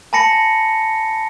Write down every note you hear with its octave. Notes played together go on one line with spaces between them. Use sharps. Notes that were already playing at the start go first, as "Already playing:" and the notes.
G#5 A5 B5 A#6 C#7